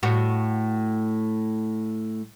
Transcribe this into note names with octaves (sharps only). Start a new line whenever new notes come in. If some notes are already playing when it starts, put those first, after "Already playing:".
A2 F#4